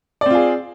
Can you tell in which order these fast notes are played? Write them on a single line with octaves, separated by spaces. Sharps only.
D5 C4 F4 G#4